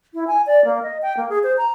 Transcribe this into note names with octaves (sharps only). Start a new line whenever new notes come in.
E4
G#5
D5
A#3
D#5
G5
A#3
G#4
C5
A#5